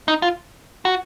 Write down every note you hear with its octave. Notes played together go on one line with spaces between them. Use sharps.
D#4
F4
F#4